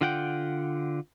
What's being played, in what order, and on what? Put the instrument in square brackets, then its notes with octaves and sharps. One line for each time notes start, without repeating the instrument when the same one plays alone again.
[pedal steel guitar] D3 F4 F#5 G5